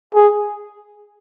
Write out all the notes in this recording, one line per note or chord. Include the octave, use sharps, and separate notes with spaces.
G#4